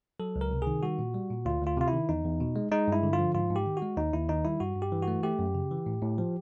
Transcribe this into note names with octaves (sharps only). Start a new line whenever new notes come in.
F#3 A4
C#2
A#4
C3
D#3 G#4
G3 F#4
A#2
G3
A#2
D2 F4
D2
F4
C3 F4
E4
D#3
E2 D#4
E2
B2
G#3
G#3 D#4
G2 E4
D3
F4
F3
G#2 F4
G#2
G4
D#3
G#3 F#4
D#2 D#4
D#2 E4
D#3 D#4
G3 E4
G2 F#4
G2
G4
E3
F#4
A3
A3 G4
F#2
C#3
E3
A2
A2
F3